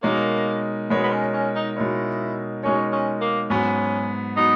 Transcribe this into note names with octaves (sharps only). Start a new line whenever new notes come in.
B2 G#3 A#3 D#4 A#4 C#5
B2 G#3 B3 D#4 A#4 C#5
B3
C#4
C#4
D#4
B2 G#3 D#4 E4 A#4 C#5
B2 G#3 C#4 D#4 A#4 C#5
C#4
A#3
G#2 F#3 B3 C#4
F#3 B3 D#4